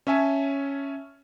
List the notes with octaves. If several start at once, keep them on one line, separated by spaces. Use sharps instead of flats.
C#4 C#5 E5 G#5 A5